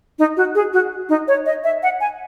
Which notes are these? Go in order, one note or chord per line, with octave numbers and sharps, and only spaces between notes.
D#4
F#4
G#4
F#4
D#4
C#5
D#5
E5
F#5
G#5